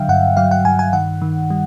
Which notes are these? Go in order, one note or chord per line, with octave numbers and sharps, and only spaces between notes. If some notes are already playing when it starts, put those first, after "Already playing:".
Already playing: D3 F#3 E5 F5 G5
G2 F#5
F#3 F5
F#5
G2 G#5
G#5
D#3 F#5
D#3
G3